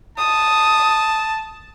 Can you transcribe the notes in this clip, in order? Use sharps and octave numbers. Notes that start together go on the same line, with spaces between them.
A5 D#6